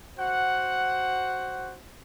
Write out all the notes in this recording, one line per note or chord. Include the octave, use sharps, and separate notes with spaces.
F#4 C5 F#5